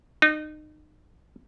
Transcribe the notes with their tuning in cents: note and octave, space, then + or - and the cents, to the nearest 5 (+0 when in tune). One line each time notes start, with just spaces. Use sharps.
D#4 -30